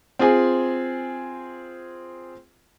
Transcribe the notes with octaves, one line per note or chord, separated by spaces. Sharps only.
C4 F4 G#4 G#5